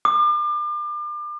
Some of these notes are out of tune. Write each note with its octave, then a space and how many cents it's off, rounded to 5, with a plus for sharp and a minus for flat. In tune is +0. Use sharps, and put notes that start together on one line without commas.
D6 +35